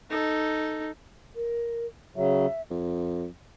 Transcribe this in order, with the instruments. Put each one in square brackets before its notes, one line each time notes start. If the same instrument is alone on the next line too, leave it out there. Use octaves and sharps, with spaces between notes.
[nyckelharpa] D#4 A4
[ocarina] A#4
[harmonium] C#3 F#3 [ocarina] E5
[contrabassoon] F2